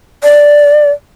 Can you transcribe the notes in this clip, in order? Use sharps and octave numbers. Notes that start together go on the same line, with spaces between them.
D5